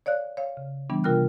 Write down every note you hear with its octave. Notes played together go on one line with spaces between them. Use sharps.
C#5 D5 F5 F#6
C#5 F5
C#3
E3 G3 B3 D4
C3 F4 A#4 G5 F6 F#6